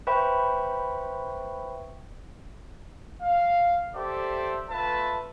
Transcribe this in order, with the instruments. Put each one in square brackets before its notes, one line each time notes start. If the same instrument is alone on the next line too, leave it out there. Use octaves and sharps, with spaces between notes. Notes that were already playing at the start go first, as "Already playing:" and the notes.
[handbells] B4 C5 E5 G5 B5 C#6
[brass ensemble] F5
G4 A4 C5 D5 E5
A3 F4 B4 E5 A5